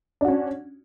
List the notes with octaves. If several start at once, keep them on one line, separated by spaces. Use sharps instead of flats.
C#4 D4 F#4